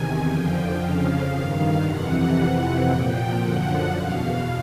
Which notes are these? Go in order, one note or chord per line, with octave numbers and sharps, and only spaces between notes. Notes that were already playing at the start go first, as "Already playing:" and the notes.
Already playing: E2 C3 D#3 G#5
F2 D3 F3 G5
F2 C#3 F3 F5
G2 D#3
F2 C3 E3 F#5
F2 C3 E3
A#2 F3 G5
F#2 D3 F3 F#5
E2 B2 F5